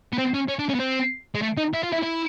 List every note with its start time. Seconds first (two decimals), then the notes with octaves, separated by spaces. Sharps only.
0.13 B3
0.18 C4
0.34 C#4
0.48 C#4
0.59 D4
0.69 C#4
0.75 B3
0.80 C4
1.35 G#3
1.42 A3
1.57 D#4
1.74 E4
1.83 F4
1.92 E4
2.03 E4